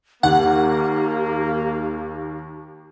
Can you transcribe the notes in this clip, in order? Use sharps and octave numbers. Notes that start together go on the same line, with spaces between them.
D#2 A#3 G4 F#5